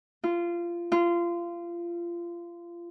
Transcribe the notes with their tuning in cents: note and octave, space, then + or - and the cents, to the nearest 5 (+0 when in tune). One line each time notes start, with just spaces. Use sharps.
F4 -20
F4 -25